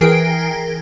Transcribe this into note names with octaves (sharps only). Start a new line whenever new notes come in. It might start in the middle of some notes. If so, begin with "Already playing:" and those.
E3 G#4 A#4 G5 C7 D7